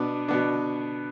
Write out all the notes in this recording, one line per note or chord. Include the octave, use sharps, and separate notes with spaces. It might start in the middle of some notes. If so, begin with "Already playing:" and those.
Already playing: B2 B3 D4
B2 B3 D4